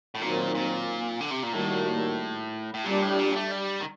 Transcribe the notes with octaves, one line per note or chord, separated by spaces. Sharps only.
A2
A#2 D#3 F#3 C4
A#2
D3
C3
A#2
A2 D#3 G3 A#3 F#4
A2
A#2 G3 D4 G4
A2
A#2
A3
G3
D#3